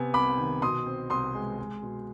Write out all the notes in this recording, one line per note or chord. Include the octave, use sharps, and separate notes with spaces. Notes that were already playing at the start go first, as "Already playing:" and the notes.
Already playing: C3 B3 G#5
C2 B5 D6
D#3
B2 C6 D#6
C4
C2 C6 D#6
G#3
G#3
B2